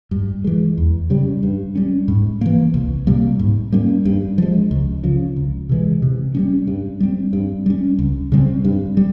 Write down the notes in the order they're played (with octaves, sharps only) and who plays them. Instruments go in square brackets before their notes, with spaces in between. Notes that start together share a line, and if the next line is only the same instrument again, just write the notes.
[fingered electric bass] G2
E3 G#3
E2
C#3 G3
G2
G3 C#4
G#2
E3 A#3
C2
C3 G3 A#3
G#2
G3 A#3 C#4
G2
F3 G#3
C#2
C#3 F3
C#2
C3 E3 G#3
C3
G3 A#3 C#4
G2
G3 C4
G2
G3 C#4
C#2
C#3 G3 C4
G2
G3